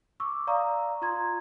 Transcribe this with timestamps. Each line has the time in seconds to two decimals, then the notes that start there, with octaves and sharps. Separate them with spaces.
0.20 C#6 D6 E6
0.47 D5 F5 A#5 C#6 D#6
1.02 F4 A#5 C6 G#6